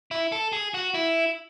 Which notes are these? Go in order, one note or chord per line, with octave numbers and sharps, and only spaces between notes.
E4
A4
G#4
F#4
E4